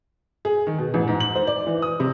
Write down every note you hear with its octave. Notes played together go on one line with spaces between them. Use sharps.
G#4
D#3
B2
A1
G#2
F#7
C5
D5
E3
D#6
C3